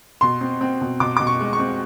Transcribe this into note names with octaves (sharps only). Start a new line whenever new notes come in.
B2 C6
C4
C4
B2
B2 D6
B2 D6
C#6
G#3
C#6
C4